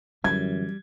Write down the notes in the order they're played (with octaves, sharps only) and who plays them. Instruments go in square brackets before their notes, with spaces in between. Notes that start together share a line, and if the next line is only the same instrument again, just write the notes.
[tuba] F#2 [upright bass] D3 E3 [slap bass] G3 [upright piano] G#6